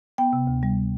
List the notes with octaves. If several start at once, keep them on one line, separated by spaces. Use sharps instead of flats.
B3 G5
C3
D2
G3